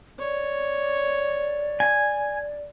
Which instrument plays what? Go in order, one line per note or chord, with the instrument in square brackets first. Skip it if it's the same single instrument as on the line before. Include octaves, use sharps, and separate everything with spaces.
[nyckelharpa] C#5 [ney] D5
[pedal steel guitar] G#5